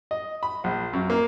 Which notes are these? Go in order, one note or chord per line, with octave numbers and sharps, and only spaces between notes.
D#5
B5
A#1
F#2
A#3